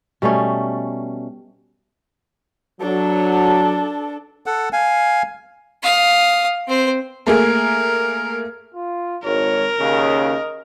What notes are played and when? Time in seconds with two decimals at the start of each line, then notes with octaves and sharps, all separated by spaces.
0.22 B2 G3 A3 C#4
2.81 F#3 D4 A4
4.46 A4 F#5
4.73 F5 G#5
5.83 F5 D#6
6.68 C4 C5
7.27 A3 A#3 G#4 A#4
8.75 F4
9.24 G#1 A#4 C#5
9.80 D#2 C#3 D#5